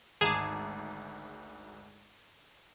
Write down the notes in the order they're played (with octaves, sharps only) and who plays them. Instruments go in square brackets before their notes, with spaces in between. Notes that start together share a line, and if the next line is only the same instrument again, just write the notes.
[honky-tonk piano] G#1 D2 G#2 [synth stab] G#4 [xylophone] A5 A#5 D6